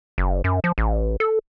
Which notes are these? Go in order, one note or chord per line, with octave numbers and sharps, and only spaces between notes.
F#1
F#2
F3
A1
A4